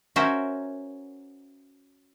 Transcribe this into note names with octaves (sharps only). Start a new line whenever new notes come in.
C#4 F#4 A#4 C5 E5